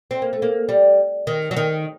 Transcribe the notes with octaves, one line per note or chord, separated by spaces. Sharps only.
C4
A#3
A3
A#3
G3
D#3
F#3
D#3